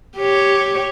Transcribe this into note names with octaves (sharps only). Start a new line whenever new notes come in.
G4 C#5